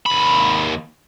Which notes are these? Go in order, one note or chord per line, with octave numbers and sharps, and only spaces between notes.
D#2 B5